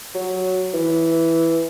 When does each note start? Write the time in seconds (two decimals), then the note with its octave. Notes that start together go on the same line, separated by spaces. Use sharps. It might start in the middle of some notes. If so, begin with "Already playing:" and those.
0.15 F#3
0.74 E3